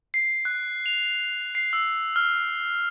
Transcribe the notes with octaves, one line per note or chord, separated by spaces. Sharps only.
C7
F#6
F7
C7
E6
F6